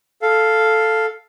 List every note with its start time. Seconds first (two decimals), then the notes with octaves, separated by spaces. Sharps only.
0.22 A4 F5